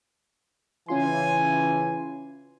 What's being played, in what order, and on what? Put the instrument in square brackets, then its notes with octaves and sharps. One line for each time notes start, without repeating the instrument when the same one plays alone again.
[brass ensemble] C#3 E3 [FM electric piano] C#4 F4 C6 [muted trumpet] G#5